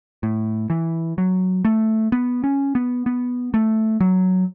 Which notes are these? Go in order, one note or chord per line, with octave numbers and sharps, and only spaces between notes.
A2
E3
F#3
A3
B3
C#4
B3
B3
A3
F#3